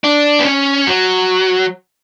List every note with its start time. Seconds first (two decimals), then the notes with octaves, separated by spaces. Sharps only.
0.04 D4
0.40 B3
0.45 C#4
0.87 F#3